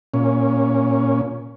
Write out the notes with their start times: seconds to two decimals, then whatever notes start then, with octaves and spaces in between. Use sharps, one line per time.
0.14 A#2 C#4